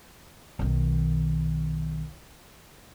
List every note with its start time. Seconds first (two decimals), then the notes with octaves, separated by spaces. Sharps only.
0.59 B1 D#3